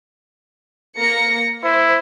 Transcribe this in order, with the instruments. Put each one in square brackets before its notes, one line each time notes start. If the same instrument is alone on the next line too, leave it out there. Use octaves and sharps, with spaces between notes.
[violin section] A#3 A#6 C#7
[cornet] E4 [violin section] C5